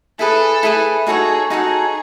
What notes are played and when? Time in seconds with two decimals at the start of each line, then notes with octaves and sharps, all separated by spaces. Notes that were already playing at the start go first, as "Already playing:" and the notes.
0.19 E4 G#4 A4 B4
0.63 E4 G#4 B4
1.06 D#4 F#4 G#4 A4 C#5
1.50 D#4 F#4 G#4 A4 C#5